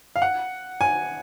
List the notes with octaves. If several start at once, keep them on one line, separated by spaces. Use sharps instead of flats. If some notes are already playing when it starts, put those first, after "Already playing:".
F5
F#5
G#5